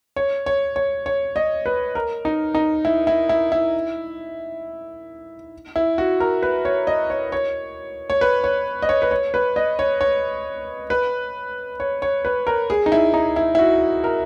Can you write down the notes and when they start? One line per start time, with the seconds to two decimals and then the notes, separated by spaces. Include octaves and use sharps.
0.16 C#5
0.46 C#5
0.76 C#5
1.06 C#5
1.36 D#5
1.66 B4
1.95 A#4
2.25 D#4
2.55 D#4
2.85 E4
3.07 E4
3.29 E4
3.52 E4
5.76 E4
5.98 F#4
6.20 A#4
6.43 B4
6.65 C#5
6.87 D#5
7.10 C#5
7.32 C#5
8.10 C#5
8.21 B4
8.44 C#5
8.82 D#5
8.89 C#5
9.02 B4
9.11 C#5
9.34 B4
9.56 D#5
9.79 C#5
10.01 C#5
10.90 B4
11.80 C#5
12.02 C#5
12.25 B4
12.47 A#4
12.70 G#4
12.86 D#4
12.92 E4
13.14 D#4
13.36 E4
13.55 E4
13.59 F#4
14.04 A#4